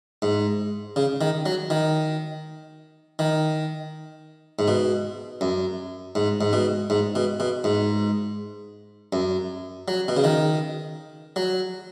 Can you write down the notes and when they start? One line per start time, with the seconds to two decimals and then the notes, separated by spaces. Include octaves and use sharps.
0.22 G#2
0.96 C#3
1.21 D#3
1.46 F#3
1.70 D#3
3.19 D#3
4.59 G#2
4.68 B2
5.41 F#2
6.15 G#2
6.41 G#2
6.53 B2
6.90 G#2
7.15 B2
7.40 B2
7.64 G#2
9.13 F#2
9.88 F#3
10.08 B2
10.17 C#3
10.24 D#3
11.36 F#3